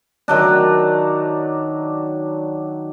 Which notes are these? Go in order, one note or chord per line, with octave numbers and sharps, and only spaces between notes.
D#3 F#3 D4